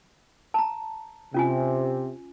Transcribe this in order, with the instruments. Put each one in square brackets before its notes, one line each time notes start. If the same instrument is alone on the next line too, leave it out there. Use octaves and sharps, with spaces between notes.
[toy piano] A5 A#5
[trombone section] C3 [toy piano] C#4 F4 G#5